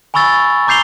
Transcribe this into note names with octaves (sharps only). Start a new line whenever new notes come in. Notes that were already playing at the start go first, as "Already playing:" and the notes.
G#5 B5 C#6 E6 A6
A#5 D6 G6 C7 F7 G7